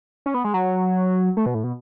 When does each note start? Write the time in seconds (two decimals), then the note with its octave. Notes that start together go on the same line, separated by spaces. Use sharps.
0.26 C#4
0.34 B3
0.44 G#3
0.54 F#3
1.37 A3
1.46 B2
1.55 A2
1.64 B2